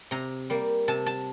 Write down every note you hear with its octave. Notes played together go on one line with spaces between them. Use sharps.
C3 A#5
G3 A#3
C3 A5
A5